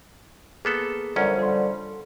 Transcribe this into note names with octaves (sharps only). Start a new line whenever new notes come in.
A#3 B3 G#4 A4
F#2 D3 F3 G3 C#4 F4 A#4
A4 C6